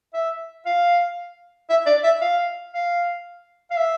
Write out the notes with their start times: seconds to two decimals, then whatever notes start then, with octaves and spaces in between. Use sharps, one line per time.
0.14 E5
0.66 F5
1.70 E5
1.86 D5
2.04 E5
2.21 F5
2.73 F5
3.70 F5
3.77 E5